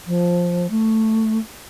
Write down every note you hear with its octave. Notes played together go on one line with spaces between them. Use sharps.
F3
A3